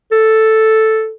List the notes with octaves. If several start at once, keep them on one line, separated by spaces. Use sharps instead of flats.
A4